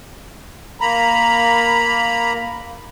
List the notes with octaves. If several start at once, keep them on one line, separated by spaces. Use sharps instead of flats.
A#3 A#5 B5